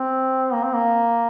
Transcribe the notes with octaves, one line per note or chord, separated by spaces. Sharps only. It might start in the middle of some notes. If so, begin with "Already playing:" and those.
Already playing: C4
A#3
C4
A#3